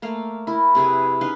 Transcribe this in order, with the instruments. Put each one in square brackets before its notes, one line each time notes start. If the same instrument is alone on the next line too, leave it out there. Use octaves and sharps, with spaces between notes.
[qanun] A3 A#3 F5
E4 A#4
C3 G#4 B4 G#5
C#4 D#4 B4 F5